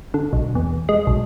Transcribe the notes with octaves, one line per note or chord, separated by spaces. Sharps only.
D3
B1
E2
G#3
B1